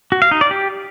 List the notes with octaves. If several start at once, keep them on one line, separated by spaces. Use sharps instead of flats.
F#4
F5
D#4
D5
G4